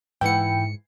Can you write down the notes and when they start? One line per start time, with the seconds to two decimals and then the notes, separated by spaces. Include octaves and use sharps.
0.21 G#2 E3 E4 F#5 G5 C#7